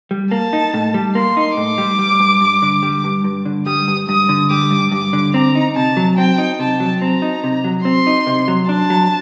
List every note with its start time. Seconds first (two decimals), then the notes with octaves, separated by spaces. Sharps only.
0.11 G3
0.31 A#3 A5
0.53 D#4
0.74 A2
0.94 G3
1.15 A#3 C6
1.37 D#4
1.57 A2 D6
1.78 G3
1.99 G3
2.20 G2
2.41 G2
2.62 D3
2.83 G3
3.04 G2
3.24 G2
3.46 D3
3.66 G3 D#6
3.88 G2
4.08 G2 D#6
4.29 D3
4.50 G3 D6
4.71 G2
4.92 G2 D6
5.13 D3
5.34 C4 A#5
5.55 D#4
5.76 C3 A5
5.97 F#3
6.17 C4 G5
6.38 D#4
6.59 C3 A5
6.80 F#3
7.02 C4 A#5
7.22 D#4
7.44 C3
7.64 F#3
7.85 C4 C6
8.07 D#4
8.27 C3
8.48 F#3
8.69 D4 A5
8.90 F#3